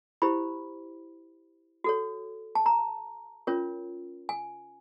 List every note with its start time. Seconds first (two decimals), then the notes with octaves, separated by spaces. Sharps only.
0.22 E4 G4 C5 B5
1.84 F#4 A4 C#5
2.55 A5
2.66 A#5
3.47 C#4 F4 A#4 C#5
4.29 G#5